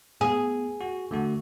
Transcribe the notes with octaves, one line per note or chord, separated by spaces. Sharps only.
B3 G#4
F#4
D3 A3 F#4